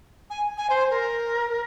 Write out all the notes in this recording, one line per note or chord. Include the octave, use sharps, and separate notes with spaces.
G#5
G#5
C5
A#4